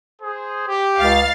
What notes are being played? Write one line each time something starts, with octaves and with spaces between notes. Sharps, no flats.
G#4 C5
G4
C#2 F5 A6